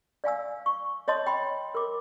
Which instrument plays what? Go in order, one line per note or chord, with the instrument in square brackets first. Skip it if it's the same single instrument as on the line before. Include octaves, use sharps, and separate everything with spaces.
[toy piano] D5 F5 G#5 E6
C#6
C#5 D#5 A5 C6 D#6
G5 B5 C6
A#4 D6